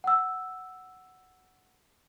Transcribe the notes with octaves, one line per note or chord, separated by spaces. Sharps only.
F#5 E6